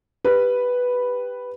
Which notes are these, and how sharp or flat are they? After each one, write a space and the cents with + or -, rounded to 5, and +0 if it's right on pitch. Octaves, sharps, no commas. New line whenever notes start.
G4 +0 B4 +0